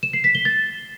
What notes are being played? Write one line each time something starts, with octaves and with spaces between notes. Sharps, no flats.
E7
C7
B6
G7
A6